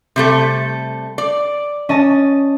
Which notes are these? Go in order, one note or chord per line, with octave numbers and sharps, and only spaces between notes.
C3 G3 A3
D5
C#4 D#5 A5